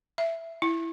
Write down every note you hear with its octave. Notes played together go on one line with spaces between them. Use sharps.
E5
E4